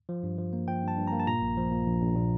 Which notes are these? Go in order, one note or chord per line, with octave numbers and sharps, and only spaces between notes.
F3
G2
F3
A#3
F3 G5
G2 A5
G2
A#5
A#3
A5
A#2 A#5
A#1
F3
A#2
A#1
A#1
A#2